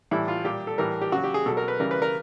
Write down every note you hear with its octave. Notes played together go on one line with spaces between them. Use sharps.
A2 E3 G3 E4
F4
A#2 G3 G4
A4
A2 E3 G3 A#4
G4
C#3 F#3 F#4
G4
G#4
B2 F#3 A4
A#4
B4
C#3 E3 G3 A#4
B4
A#4